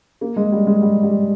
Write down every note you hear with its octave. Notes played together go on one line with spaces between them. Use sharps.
A#3
G#3
G3
G#3
G3
G3